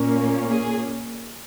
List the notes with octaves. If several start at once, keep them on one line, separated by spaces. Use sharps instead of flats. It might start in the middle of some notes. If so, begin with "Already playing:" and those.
Already playing: A#2 A#3 C#4
G#4